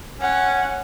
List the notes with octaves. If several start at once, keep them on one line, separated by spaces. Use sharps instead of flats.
C#4 F#5